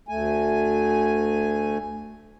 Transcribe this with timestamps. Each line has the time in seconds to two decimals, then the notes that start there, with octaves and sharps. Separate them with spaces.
0.09 D2 A3 G#5